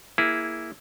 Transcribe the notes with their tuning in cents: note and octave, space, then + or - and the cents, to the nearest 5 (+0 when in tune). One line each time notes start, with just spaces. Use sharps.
A#3 +0 E4 +0 G#4 +0